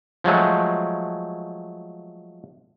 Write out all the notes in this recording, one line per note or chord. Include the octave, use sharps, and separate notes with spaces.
F3 F#3 G#3 A3